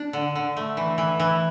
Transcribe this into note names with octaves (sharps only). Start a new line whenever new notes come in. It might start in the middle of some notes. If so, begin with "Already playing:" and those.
Already playing: D4
D3
D3
A3
E3
E3
E3